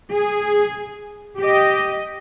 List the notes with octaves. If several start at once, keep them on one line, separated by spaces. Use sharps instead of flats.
G#4
G4 D#5